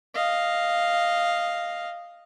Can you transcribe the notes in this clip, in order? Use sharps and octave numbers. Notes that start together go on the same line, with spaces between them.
D#5 F5